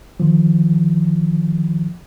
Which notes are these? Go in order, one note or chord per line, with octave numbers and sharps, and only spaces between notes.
D#3 F3